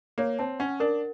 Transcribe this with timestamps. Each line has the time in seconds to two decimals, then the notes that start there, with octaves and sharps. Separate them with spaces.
0.18 A#3 C#5
0.39 C4 A5
0.60 C#4 F#5
0.80 D4 A#4